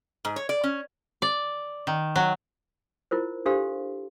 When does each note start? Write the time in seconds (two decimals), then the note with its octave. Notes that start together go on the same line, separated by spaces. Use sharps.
0.25 G#2
0.36 C#5
0.49 D5
0.64 C#4
1.22 D5
1.87 D#3
2.16 F#3
3.11 E4 F4 A#4 C5
3.46 D4 G4 A4 C5 F5 C6